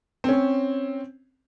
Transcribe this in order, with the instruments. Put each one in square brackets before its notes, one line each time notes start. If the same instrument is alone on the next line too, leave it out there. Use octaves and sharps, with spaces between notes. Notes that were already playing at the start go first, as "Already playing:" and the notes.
[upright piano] C4 C#4